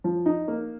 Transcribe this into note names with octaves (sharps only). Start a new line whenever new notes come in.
F3
D#4
A#3